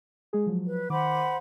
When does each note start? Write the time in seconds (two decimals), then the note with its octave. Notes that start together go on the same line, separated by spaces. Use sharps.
0.33 G#3 G#4
0.47 F3 F#3
0.68 B4
0.90 D#3 C5 F#5 B5 D6